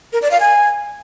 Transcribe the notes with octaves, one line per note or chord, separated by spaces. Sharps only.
A#4
D5
F5
G#5